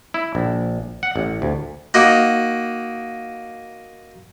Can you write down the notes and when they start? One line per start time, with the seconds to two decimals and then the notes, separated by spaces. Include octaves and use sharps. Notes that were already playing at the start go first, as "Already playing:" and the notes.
0.14 E4
0.35 A#1
1.03 F#5
1.16 A1
1.42 D2
1.94 A#3 D#4 F#4